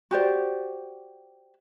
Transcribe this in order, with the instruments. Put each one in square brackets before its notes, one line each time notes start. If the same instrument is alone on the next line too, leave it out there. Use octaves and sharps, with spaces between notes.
[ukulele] F#4 G4 C5 D5